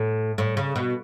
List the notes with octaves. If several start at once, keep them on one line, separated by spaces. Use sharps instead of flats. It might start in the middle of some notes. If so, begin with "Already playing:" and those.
Already playing: A2
A2
C#3
B2